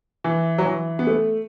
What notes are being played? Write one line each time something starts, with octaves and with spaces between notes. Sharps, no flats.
E3
F#3
E3
B3
A3